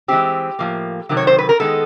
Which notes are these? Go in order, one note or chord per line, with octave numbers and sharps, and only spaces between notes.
E3 G#3 C4 G4
A2 F3 A#3
C3 D#3 F#3
C#5
C5
B4
A#4
D#3 G#3 B3 A4